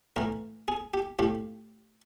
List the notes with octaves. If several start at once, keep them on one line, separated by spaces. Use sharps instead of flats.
A2 E3 A#4
G#4
G4
A2 F3 G4